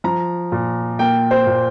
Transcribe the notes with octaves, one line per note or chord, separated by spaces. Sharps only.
F3 A#5
A#2
A#3 G5
C5
A#2